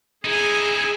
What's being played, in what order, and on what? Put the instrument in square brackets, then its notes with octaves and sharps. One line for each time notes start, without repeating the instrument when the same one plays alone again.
[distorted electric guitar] D#4 E4 [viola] G#4 G#5